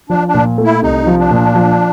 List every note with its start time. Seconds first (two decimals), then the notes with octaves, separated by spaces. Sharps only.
0.09 F3 D4
0.28 D4
0.34 A#2
0.58 A3
0.64 E4
0.82 C2 D#4
1.07 F3
1.18 D4
1.31 A#2
1.55 F3